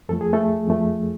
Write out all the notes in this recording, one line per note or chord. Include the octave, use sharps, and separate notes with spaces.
F2 F3 A3 A4
G#4
A3 A4
F2 F3 A3